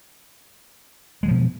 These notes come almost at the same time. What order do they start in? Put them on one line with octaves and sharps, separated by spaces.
G#3 F#3 F3 B2